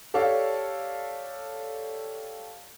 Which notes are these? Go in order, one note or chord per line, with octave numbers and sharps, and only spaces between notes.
G4 A4 C#5 D5 F5